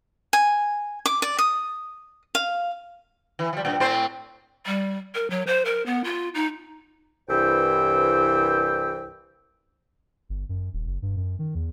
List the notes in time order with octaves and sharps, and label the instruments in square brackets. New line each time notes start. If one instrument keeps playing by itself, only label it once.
[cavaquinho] G#5
D6
D5
D#6
F5
[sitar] E3
F3 G3
G2 A#2
A2 C4 C5
[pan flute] G3
A#4
F#3
C5
A#4
B3
F4
D#4
[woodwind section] C2 G2 E3 C5 G5 E6
[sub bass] G1
F#2
D#1
F#1
G2
F#2
D#3
E2